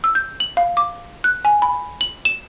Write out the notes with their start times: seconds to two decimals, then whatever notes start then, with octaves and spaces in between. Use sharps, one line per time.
0.04 E6
0.15 G6
0.40 F#7
0.57 F5
0.77 D6
1.24 F#6
1.45 G#5
1.62 B5
2.01 F#7
2.25 E7